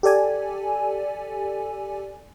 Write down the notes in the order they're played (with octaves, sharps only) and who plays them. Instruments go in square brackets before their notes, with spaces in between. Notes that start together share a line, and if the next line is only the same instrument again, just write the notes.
[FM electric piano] G4 A4 D5 G#5